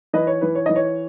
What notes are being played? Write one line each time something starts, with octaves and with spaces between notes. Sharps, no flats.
E3 B4 D#5
C#5
E3 B4
C#5
E3 D#5
C#5